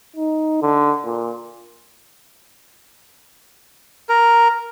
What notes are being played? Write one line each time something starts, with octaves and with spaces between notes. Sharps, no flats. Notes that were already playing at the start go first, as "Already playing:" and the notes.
D#4
D3
A#2
A#4